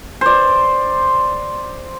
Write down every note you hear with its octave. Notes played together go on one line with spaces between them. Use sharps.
C5 D5